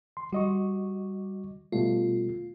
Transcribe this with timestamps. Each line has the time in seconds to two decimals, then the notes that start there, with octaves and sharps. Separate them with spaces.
0.17 C6
0.32 G3 F#4 D#5 C#6
1.72 B2 G3 A3 F4